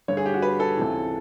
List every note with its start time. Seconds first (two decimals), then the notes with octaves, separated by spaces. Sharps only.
0.08 G2 D3 C#5
0.17 G#4
0.26 G4
0.34 F#4
0.42 B4
0.60 A4
0.77 C#2 C3 E3